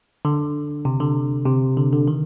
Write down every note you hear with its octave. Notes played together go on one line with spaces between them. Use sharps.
D3
C3
D3
C3
D3
D3
D#3